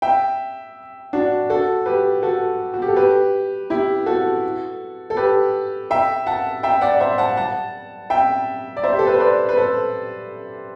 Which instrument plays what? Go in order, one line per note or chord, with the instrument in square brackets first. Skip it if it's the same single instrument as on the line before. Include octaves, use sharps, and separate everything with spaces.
[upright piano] E5 G5
D4 F#4
F#4 A4
G4 B4
F#4 A4
F#4
G4
A4
G4 B4
E4 G4
F#4 A4
A4
G4 B4
E5 G5
F#5 A5
E5 G5
D5 F#5
C5 E5
F#5 A5
F#5 A5
E5 G5
D5
C5 E5
G4
A4
B4
C5
B4 D5
B4
A4 C5